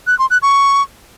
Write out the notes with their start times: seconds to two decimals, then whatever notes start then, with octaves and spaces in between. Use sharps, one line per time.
0.07 F#6
0.19 C6
0.30 F#6
0.42 C#6